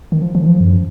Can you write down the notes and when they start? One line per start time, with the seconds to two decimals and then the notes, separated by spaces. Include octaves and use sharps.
0.12 D#3
0.22 F3
0.35 F3
0.42 D#3
0.47 F3
0.61 F#2